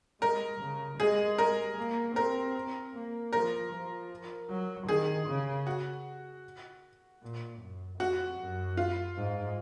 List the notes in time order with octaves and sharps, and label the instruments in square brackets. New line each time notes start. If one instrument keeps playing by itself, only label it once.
[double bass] G#3 [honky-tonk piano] A#4
[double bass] C#3
[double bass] G#3 [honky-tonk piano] G#4
[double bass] G#3 [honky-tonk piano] A#4
[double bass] A#3
[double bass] C4 [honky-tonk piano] A#4
[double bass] A#3
[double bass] F3 [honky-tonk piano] A#4
[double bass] F3
F#3
[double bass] D#3 [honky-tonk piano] G#4
[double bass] C#3
[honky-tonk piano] F#4
[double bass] A#2
F#2
[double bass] F2 [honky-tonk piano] F#4
[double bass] F#2
[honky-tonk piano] F4
[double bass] G#2